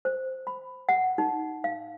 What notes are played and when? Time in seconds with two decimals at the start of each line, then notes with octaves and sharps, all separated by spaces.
0.05 C5
0.47 B5
0.89 F#5
1.18 D#4
1.64 F5